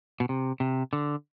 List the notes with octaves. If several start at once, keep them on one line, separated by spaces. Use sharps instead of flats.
B2
C3
C3
D3